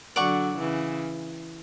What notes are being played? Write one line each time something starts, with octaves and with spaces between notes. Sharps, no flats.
D3 F#3 D5 F#5 C#6
C#3 E3